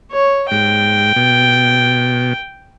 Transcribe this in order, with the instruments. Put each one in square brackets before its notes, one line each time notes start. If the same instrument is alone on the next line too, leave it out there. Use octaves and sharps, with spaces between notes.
[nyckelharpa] C#5
[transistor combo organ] G#2 [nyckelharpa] G5
[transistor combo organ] B2